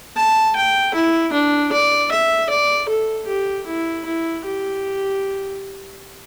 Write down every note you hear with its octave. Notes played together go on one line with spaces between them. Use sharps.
A5
G5
E4
D4
D5
E5
D5
A4
G4
E4
E4
G4